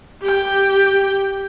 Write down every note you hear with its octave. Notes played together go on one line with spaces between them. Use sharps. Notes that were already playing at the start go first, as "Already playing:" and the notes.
G4 G5